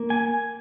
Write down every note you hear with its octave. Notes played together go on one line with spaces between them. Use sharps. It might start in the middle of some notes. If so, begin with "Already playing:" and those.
Already playing: A#3
G#5